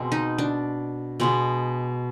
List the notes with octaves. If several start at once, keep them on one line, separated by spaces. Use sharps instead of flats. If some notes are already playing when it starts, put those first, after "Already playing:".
Already playing: B2 G#3 C4
D#4
D4
B2 G#3 B3